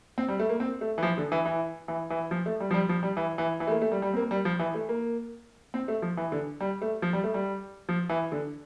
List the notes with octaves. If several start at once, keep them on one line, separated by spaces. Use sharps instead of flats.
C4
G3
A3
A#3
C4
A3
E3
F3
D3
E3
E3
E3
E3
F3
A3
G3
F3
G3
F3
G3
E3
E3
E3
A3
A#3
A3
G3
G3
C4
A#3
G3
F3
E3
A3
A#3
C4
A3
F3
E3
D3
G3
A3
F3
G3
A3
G3
F3
E3
D3